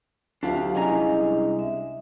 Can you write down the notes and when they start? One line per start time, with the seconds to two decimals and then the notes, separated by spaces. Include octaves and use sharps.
0.43 D2 F#3 D4 F4 G4 F5
0.75 C2 G#3 C#4 D4 E4 D#5 A#5
1.59 E5